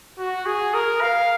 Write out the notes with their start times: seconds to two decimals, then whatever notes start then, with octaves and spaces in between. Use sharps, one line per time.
0.19 F#4
0.46 G#4
0.74 A#4
1.02 F5